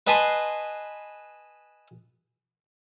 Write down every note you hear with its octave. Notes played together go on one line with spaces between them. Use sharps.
B4 D#5 G#5 A5 B5 C6